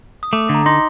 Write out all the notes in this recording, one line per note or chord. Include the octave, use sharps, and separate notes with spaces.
D#6
A3 D6
D3
A#5
D#4 C6